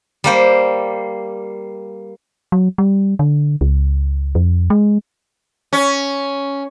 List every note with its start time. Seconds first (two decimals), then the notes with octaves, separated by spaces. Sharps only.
0.24 G3 A#3 C5
2.52 F#3
2.78 G3
3.19 D3
3.61 C#2
4.35 F2
4.70 G#3
5.73 C#4